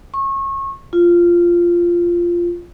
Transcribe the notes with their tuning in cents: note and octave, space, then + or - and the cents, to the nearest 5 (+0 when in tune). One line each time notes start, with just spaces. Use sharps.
C#6 -30
F4 -10